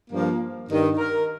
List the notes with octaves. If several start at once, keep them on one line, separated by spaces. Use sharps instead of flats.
G2 F3 A#3
G2 D#3
A#4